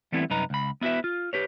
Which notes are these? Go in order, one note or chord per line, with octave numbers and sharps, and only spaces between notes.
E3 G3 A3 B3 C4 E4
C2 F#2 D#4 B4 A#5
C#2 B5
B3 E4 F#4 B4 E5
F4
G4 B4 C#5